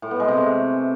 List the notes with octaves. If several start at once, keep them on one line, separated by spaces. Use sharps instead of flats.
A2
B3
G#3
C3
A3